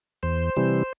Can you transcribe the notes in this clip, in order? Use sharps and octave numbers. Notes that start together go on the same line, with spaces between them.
E2 C5
C3 E3 G3